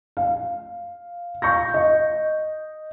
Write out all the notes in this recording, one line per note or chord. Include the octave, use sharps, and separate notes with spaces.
F5
F5 C#6 G6 A#6
D#5